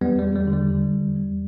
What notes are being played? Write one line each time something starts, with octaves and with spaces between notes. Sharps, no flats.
E2 G3 B3
E2 G3
G3
D3
G3
D3
E2
E2